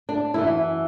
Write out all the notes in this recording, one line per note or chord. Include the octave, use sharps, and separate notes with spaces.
D4
F#2 E3 E4